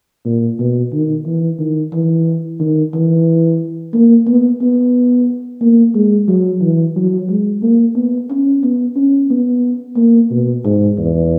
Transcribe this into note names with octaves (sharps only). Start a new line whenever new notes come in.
A#2
B2
D#3
E3
D#3
E3
D#3
E3
A#3
B3
B3
A#3
G#3
F#3
E3
F#3
G#3
A#3
B3
C#4
B3
C#4
B3
A#3
B2
G#2
E2